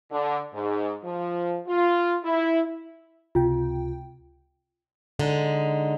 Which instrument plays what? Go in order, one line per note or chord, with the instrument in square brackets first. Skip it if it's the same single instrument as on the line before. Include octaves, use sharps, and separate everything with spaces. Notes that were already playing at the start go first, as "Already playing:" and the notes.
[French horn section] D3
G#2
F3
F4
E4
[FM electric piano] C#2 C3 G5 [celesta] F4
[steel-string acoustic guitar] D3 G#3 D#4